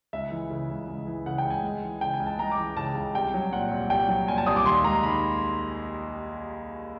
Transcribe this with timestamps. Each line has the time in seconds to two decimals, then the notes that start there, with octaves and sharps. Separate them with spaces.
0.13 C#2 E5
0.32 E3
0.50 C#3
0.69 C#2
0.88 C#2
1.07 E3
1.26 C#3 F#5
1.38 G5
1.45 C#2
1.50 G#5
1.63 G#3
1.83 E3
2.01 C#3 G5
2.14 G#5
2.20 C#2
2.27 A5
2.39 G#3 A#5
2.52 D6
2.58 E3
2.77 C#3 A5
2.96 C#2
3.15 C2 G5
3.34 F#3
3.53 A#2 F#5
3.71 C2
3.90 C2 G5
4.09 F#3
4.28 A#2 G#5
4.38 A5
4.46 C2 D#6
4.56 D6
4.65 D#2 C6
4.84 G#3 A#5
5.03 D#3 B5